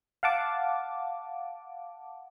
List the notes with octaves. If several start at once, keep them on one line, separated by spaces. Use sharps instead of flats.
F5 F#5 A5 D6